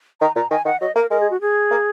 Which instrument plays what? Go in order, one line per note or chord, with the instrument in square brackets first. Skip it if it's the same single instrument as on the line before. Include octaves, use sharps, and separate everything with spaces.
[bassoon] D#3 [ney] A#5
[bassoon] A#2 [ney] A#5
[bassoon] D#3 [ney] G#5
[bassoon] D#3 [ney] F#5
[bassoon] F#3 [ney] D#5
[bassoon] A#3 [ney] A#4
[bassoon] G#3 [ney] A#4
[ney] G#4
F#4
G#4
[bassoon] A#3